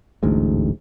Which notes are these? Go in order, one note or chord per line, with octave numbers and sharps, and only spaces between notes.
D1 A1 D2 G#2